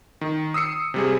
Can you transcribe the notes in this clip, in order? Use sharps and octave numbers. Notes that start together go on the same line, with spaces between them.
D#3
D#6 E6 C7 C#7
C3 G3 G#4